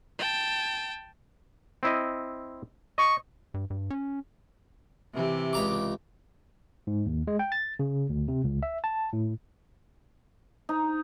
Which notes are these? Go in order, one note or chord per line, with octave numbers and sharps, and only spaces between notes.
G5 A5
C4 E4 D#5
D#5 C#6
G2
G2
C#4
C3 E3 G4
C#2 A#5 D6
G#2
D#2
G#3
G5
A6
C#3
D2
C3
C#2
E5
A5
A2
D#4